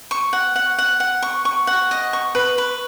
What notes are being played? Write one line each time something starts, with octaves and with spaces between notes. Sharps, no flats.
C#6
F#5
F#5
F#5
F#5
C#6
C#6
F#5
D#5
C#6
B4
B4